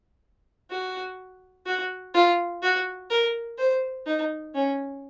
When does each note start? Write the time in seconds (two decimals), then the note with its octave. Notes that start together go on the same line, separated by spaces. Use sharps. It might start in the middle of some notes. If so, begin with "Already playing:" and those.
0.70 F#4
1.66 F#4
2.15 F4
2.63 F#4
3.10 A#4
3.58 C5
4.07 D#4
4.55 C#4